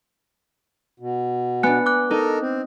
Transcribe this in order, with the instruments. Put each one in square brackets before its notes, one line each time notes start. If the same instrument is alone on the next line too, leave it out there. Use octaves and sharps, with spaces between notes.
[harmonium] B2
[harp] B3 D4 [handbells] G#5 F#6 C#7
[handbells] D6 F#6
[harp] D#4 [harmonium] A4 A#4
[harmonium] C4